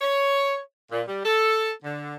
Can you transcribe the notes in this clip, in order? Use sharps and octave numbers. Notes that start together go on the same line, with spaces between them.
C#5
A#2
G3
A4
D3